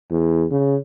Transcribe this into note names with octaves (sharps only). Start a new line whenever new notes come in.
E2
C#3